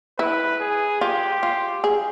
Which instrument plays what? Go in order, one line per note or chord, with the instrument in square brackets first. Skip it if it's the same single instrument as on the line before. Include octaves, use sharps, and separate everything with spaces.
[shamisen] E4 [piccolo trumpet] B4
[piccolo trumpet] G#4
[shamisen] F4 [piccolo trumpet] G4
[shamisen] F4
G#4